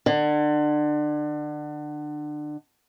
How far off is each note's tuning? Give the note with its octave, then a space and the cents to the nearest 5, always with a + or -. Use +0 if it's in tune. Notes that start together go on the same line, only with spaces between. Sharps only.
D3 +30